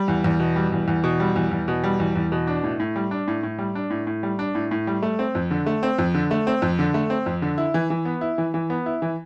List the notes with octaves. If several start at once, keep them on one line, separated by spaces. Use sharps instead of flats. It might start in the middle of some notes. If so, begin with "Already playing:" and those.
Already playing: G3
E2
E2
B2
G3
E2
E2
B2
G3
E2
E2
B2
G3
E2
E2
B2
D4
A2
A2
G3
D4
A2
A2
G3
D4
A2
A2
G3
D4
A2
A2
G3
A3
C4
F2
D3
A3
C4
F2
D3
A3
C4
F2
D3
A3
C4
F2
D3
E4
E3
E3
B3
E4
E3
E3
B3
E4
E3